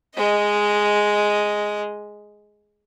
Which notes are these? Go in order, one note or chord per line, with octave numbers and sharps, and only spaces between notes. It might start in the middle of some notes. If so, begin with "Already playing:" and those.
G#3 D#5